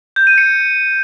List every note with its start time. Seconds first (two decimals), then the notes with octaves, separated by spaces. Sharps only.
0.16 G6
0.27 D#7
0.38 C#7